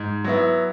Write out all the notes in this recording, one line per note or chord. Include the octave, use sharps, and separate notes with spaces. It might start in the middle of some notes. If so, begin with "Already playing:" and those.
Already playing: G#2
F#3 B3 E4